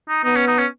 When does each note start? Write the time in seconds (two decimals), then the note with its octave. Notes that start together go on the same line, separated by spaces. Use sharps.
0.09 D#4
0.24 B3 D#4
0.36 C#4
0.47 D#4
0.58 C#4